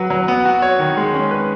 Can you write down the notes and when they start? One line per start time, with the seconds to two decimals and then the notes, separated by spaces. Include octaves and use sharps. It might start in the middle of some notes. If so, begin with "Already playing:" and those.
Already playing: F#3 B4
0.10 F#3
0.28 B3
0.45 F#4
0.62 C#5
0.79 D#3
0.97 G#3
1.14 C#4
1.31 B4